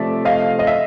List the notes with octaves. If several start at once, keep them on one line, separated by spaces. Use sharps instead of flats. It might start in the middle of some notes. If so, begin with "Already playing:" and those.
Already playing: C3 F3 A3 D5 E5
D#5 F5
D#5
E5